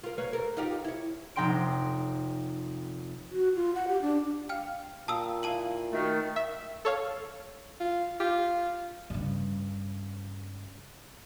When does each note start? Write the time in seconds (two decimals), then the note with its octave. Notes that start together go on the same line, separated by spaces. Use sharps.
0.03 F4 A#4
0.18 A#3 B4 C#5
0.33 A4 A#4
0.57 D#4 F4 G4
0.84 E4 C#5
1.36 F1 D#4 G5 C6 D7
3.32 F#4
3.55 F4
3.75 F#5
3.88 G4
4.02 D4
4.49 F5 G5 F6
5.08 A#2 F5 G5 A5 A#5 D#6 E6
5.43 E4 E5 F5 A5 D#7 F#7
5.93 D#3 A3 F#4
6.36 E5
6.85 A4 C#5 F5
7.80 F4
8.20 F4 G4
9.10 G2 C#3